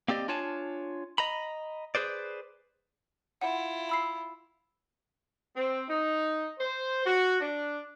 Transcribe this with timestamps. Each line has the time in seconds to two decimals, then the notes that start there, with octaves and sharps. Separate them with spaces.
0.08 A#3 C4 G4 D5 D#5
0.28 D4 F4 C#5 G#5 A5
1.18 D#5 A#5 B5
1.95 G#4 B4 C5 D5
3.41 E4 F4 F#5
3.89 B5 E6 C7
5.56 C4
5.89 D#4
6.58 C5
7.06 F#4
7.41 D4